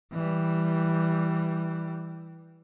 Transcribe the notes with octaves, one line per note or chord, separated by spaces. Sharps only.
E3 G3